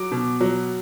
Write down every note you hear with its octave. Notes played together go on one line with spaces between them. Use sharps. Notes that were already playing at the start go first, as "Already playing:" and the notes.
Already playing: F#3 D6
B2
F#3